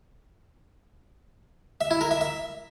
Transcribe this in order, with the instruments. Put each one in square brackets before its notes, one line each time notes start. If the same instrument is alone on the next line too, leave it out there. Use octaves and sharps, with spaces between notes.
[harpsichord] E5
E4
A#4
E5
E5